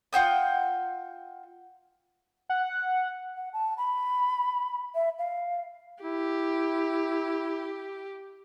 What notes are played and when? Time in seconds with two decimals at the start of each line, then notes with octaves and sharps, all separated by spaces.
0.13 F4 F#5 G5 D#6
2.49 F#5
3.37 F#5
3.53 A5
3.78 B5
4.95 E5
5.19 F5
6.03 E4 G4